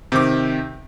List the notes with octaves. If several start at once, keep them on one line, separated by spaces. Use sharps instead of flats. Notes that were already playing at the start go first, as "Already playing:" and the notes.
C3 D#3 D6